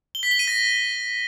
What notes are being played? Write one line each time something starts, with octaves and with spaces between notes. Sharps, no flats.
G7
B6
G7
D#7
A#6